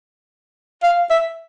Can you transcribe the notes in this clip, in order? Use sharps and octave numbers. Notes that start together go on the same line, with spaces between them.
F5
E5